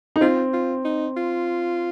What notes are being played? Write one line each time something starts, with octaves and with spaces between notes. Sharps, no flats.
D#4
C4 F4
F4
D#4
F4